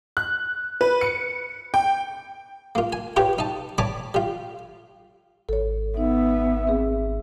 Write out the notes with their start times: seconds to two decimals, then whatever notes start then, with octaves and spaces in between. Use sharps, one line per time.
0.17 F#6
0.81 B4
1.01 C#7
1.74 G5
2.75 A#3 F4
2.93 G#5
3.16 F4 G4 B4 C#5 G5
3.39 D#4 A5
3.78 C#5 D5 G#5 A5 B5 D6
4.14 G3 F4
5.49 G#1 A4 C#5
5.97 B3 D#4 E5
6.67 C4 G#4